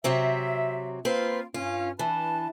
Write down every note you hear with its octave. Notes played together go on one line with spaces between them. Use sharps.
C3 F#3 C4 E5
A#3 C4 F4 B4
G2 C#4 F4
E3 D4 B4 A5